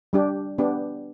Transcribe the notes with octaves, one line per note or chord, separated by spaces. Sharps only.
G3 D4 G4
B3 D4 G4